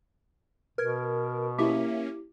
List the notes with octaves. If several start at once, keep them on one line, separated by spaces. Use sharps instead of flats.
B2 A#4 B4 G#6
A#3 C#4 E4 G4 E5 D6